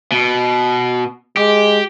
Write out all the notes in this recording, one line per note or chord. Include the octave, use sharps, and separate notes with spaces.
B2
G#3 G4